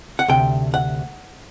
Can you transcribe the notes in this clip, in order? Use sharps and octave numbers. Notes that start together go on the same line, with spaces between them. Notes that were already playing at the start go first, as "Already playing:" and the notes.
F#5
D2 C3 G5
F#5